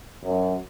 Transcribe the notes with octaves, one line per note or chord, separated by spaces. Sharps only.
F#2